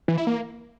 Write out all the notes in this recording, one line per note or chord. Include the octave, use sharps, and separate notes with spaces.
E3
E4
A#3